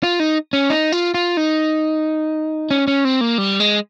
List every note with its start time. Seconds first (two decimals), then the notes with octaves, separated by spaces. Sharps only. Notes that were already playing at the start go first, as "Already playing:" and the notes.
0.03 F4
0.20 D#4
0.53 C#4
0.70 D#4
0.92 F4
1.14 F4
1.37 D#4
2.71 C#4
2.88 C#4
3.05 C4
3.21 A#3
3.38 G3
3.60 G#3